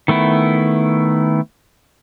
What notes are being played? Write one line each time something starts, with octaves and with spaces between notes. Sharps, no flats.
D#3 A3 B3 E4